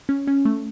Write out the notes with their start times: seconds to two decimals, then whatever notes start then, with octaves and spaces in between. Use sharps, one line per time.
0.09 C#4
0.27 C#4
0.45 A3